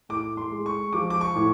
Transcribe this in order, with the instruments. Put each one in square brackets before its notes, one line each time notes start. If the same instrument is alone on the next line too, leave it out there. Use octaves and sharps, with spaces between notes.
[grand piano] A2 D6
C6
G#3
C#6
F3 D6
D6
C#6
A2